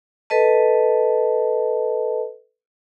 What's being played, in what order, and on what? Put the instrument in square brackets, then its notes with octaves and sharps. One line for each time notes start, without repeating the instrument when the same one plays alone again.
[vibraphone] A4 B4 D#5 A5